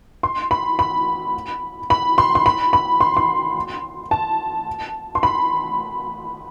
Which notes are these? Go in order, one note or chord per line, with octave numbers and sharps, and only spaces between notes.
C6
B5
B5
B5
C6
C6
B5
B5
C6
C6
A5
C6
B5